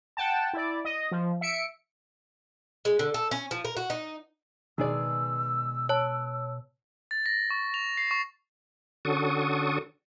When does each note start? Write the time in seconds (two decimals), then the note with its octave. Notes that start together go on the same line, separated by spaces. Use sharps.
0.17 F#5 G5 A5
0.53 E4 D5
0.85 D#5
1.11 F3
1.41 E5 C#7 D7
2.85 G#3
2.99 D3
3.14 A4
3.31 C#4
3.51 F3
3.65 A#4
3.77 F#4
3.90 D#4
4.78 B2 D#3 G#3 G#4 D5 E6
5.89 C#5 A5
7.11 A6
7.26 A#6
7.50 C#6
7.74 F7
7.97 C7
8.11 C#6
9.05 D3 C#4 F#4 A4 C#6 D#6